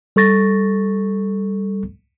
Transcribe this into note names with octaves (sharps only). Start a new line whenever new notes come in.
G3 A4 C#6 A6 A#6